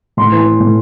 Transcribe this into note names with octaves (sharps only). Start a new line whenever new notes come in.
A2 C6
E3
E3
A2